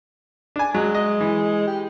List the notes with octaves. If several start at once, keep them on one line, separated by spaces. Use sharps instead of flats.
D4 G#5
F#3 G#3
D#5
E3
G4